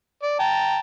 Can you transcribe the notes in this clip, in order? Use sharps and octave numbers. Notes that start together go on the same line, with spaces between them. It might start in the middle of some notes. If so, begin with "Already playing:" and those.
D5
G5 A5 A#5